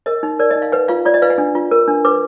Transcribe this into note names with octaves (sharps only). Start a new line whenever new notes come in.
A#4 D#5
D#4
A#4 D5
D#5
D#4
F5
B4 F#5
F4 F5
F4 D5
D#5
B4 F5
F#5
D4
F4
A#4
D4
B4 D6